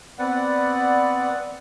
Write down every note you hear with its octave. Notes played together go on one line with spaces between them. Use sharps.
B3 C4 B4 D5 F#5